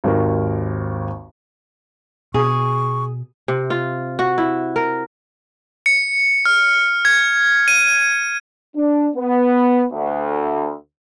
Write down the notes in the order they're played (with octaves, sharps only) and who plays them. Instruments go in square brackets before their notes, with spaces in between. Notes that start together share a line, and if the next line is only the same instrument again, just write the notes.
[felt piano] G#1 D#2 A#4
[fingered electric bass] B2 [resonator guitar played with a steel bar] G#4 [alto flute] C#6
[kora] C3
F4
F#4
E4
A#4
[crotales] C#7
F6
G#6
D#7
[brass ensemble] D4
B3
D2